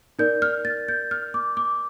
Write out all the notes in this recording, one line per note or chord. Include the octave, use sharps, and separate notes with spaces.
D#4 A#4 D5 G6
F6
A6
G6
F6
D6
D6